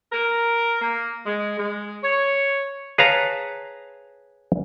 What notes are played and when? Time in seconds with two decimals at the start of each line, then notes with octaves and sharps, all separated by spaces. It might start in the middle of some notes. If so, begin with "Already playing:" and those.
0.13 A#4
0.81 A#3
1.25 G#3
1.58 G#3
2.04 C#5
2.98 G#4 B4 C#5 F5 A5 A#5